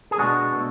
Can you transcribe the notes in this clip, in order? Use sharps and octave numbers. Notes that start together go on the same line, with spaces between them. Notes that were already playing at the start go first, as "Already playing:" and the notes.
G#4
B2 G#3 B3 D4 F#4
B2 A3